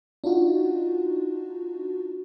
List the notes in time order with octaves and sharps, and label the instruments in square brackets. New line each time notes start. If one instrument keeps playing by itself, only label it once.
[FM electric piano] D4 D#4 F4 F#4